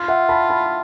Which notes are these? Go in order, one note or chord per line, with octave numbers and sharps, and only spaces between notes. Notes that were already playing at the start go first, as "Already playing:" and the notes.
Already playing: F4
E5 F#5
A5 B5
A5 B5